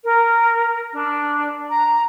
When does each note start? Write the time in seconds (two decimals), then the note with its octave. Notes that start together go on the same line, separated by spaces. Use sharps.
0.03 A#4
0.92 D4
1.69 A#5